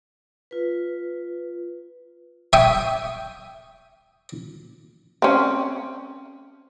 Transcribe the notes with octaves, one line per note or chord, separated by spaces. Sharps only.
F4 B4
E5 G5 G#5 C#6 D#6
C4 C#4